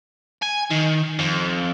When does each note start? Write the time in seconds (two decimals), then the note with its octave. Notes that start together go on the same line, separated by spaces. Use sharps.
0.42 G#5
0.70 D#3
1.19 F2